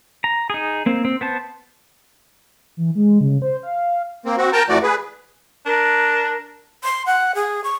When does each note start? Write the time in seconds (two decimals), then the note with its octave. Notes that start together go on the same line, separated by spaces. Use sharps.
0.24 A#5
0.50 D#4 G#4
0.86 A#3 C4
1.05 C4
1.21 B3 C5 A5
2.77 E3
2.95 G#3
3.21 C#3
3.42 C5
3.63 F5
4.25 A#3 C4
4.37 C4 F#4
4.53 A#4 G5 A5 A#5
4.69 F2 E3 A3 F#4 D5
4.83 G#4 B4
5.66 D4 A#4
6.84 C6
7.06 F#5
7.35 G#4
7.64 C#6